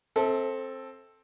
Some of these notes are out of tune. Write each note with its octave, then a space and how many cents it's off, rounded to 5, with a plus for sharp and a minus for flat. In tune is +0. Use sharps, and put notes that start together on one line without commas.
C4 +15 A4 +0 E5 -35